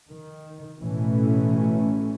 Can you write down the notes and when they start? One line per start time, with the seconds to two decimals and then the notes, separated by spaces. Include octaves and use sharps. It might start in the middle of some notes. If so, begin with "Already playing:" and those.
0.11 D#3
0.81 A1 B2 E3 A3 C#4